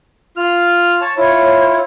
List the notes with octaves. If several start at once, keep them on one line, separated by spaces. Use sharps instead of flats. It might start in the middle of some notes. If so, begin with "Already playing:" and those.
F4 F6
C#5 A5
E4 F4 C#5